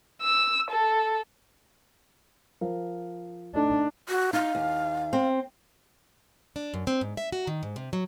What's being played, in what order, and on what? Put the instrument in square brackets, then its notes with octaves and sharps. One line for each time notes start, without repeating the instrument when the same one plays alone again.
[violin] E6
A4
[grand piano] F3 A#4 F5
[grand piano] A3 D#4 [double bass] D4
[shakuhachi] F#4
[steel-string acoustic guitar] D#4 [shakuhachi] F5
[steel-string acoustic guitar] D#2
C4
D4
F#2
C4
G#2
E5
F#4
D#3
G#2
C3
F#3